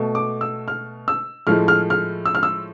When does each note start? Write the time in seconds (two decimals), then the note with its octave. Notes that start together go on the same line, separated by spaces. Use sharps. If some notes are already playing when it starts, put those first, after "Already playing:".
Already playing: B2 A3
0.15 D6
0.41 E6
0.68 F6
1.08 E6
1.47 A2 F3 G#3 F6
1.68 F6
1.90 F6
2.25 E6
2.35 F6
2.43 E6